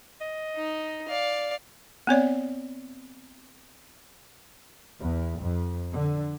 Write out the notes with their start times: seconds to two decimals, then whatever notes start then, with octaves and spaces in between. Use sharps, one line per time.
0.21 D#5
0.56 D#4
1.08 D5 F5
2.07 B3 C4 C#5 D5
4.98 E2
5.40 F2
5.94 D3